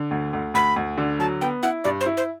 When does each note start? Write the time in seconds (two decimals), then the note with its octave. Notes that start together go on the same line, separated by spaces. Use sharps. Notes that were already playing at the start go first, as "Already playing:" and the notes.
Already playing: D3
0.11 D2
0.33 D2
0.54 D2 B5
0.76 D2
0.97 D3
1.19 F#3 A5
1.41 B3 G5
1.63 E4 F#5
1.84 G2 D5
2.01 C5
2.06 E4
2.17 C5